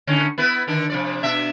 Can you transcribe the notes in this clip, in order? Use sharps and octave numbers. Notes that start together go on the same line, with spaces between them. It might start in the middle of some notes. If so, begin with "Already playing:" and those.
A2 D3 C#4
B3 E4 B4
D3 D#3 D4
C3 F3 D5
B2 D4 E5